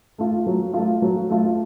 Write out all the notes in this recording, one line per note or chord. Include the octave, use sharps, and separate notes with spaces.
A3 F4
F#3
A3 F4
F#3
A3 F4